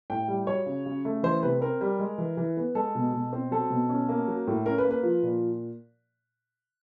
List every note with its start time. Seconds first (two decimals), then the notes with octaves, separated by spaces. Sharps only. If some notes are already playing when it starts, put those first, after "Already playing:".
0.10 A2 G5
0.28 G3
0.47 F#3 C#5
0.66 C#3
0.86 C#3
1.05 A3
1.23 E3 C5
1.43 C3 B4
1.61 C4 A#4
1.81 G3
1.99 G#3
2.18 E3
2.37 E3
2.57 B3
2.75 G#3 A4
2.95 B2
3.13 B2
3.33 C4
3.51 F#3 A4
3.70 B2
3.89 C#4
4.09 A#3
4.28 F#3
4.47 A2
4.66 C#4 A#4
4.78 B4
4.85 A#3
4.91 B4
5.03 F3
5.23 A#2